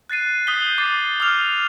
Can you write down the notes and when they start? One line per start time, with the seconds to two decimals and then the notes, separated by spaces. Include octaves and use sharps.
0.10 F#6 A6 C7 D#7
0.47 D#6 G6 B6 G7
0.78 D6 A6 C7
1.20 D6 D#6 F6 F7